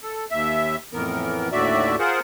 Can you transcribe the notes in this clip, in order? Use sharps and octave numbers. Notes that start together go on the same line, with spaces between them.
A4
D#2 E5
F2 A2 E3 B3 A#4
D#2 A2 D3 F#4 D5 E5
F4 G#4 A#4 C5 F#5